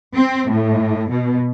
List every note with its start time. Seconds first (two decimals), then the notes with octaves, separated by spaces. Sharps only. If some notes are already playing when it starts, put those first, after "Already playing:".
0.16 C4
0.50 A2
1.11 B2